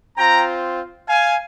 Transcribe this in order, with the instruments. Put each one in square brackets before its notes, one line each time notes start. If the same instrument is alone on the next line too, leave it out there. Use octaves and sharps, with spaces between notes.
[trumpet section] C4 F4 G5 A#5
F5 G#5